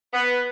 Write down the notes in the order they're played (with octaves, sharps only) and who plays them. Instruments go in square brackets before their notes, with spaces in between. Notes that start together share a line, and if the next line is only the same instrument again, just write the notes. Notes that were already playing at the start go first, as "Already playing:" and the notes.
[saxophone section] B3